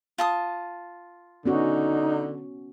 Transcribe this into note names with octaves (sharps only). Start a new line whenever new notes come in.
F4 A5 D#6
D3 B3 C#4 D#4 F#4